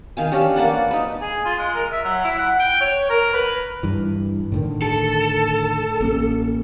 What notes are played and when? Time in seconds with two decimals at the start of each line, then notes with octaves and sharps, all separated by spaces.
0.17 D#3 F5 G#5
0.32 C#4 D4 G4
0.56 A#3 B4 D5 F#5
0.91 D#4 B4
1.21 G#4
1.45 F4
1.58 G#3
1.74 A#4
1.92 E5
2.05 F#3
2.24 E4
2.38 F#5
2.59 G5
2.81 C#5
3.10 A#4
3.33 B4
3.83 G2 E3
4.52 A2 D3 D#3
4.82 A4
6.01 A1 A#3 C#4